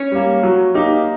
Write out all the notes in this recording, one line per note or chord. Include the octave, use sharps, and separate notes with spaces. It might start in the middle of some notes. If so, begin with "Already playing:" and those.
Already playing: C#4 C#5
G3 A#3
F#3
A#3 D#4 G4